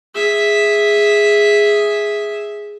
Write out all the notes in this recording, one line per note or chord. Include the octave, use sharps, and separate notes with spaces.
G#4 E5